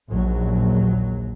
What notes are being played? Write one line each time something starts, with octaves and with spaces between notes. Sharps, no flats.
A#1 D#2 F#3